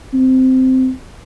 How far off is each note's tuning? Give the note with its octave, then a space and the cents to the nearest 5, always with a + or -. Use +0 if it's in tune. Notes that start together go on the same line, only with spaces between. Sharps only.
C4 -10